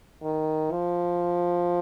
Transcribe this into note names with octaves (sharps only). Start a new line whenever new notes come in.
D#3
F3